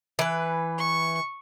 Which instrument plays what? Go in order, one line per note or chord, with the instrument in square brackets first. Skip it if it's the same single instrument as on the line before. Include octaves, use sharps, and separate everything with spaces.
[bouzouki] E3 B4
[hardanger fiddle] C#6